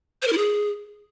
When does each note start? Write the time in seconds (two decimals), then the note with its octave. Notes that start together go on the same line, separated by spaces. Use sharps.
0.22 C5
0.27 A#4
0.32 E4
0.38 G#4